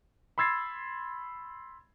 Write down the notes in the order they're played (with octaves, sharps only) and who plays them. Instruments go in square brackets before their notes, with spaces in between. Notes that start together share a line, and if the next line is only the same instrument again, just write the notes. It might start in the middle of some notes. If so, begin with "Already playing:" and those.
[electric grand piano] B5 C6 E6 G#6 A6 C7